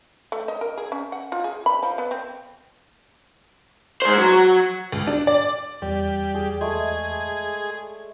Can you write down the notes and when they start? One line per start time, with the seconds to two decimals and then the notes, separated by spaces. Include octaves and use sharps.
0.32 A3
0.48 D#5
0.61 A#4
0.77 G#4
0.92 C#4
1.12 F#5
1.32 F4
1.44 G#4
1.66 B5
1.83 F3
1.98 B3
2.11 C4
4.02 G#3 C5
4.18 F#3
4.92 C#2
5.07 D4
5.27 D5
5.82 E2 G3 D5
6.35 G#4
6.61 G#3 A3 G#4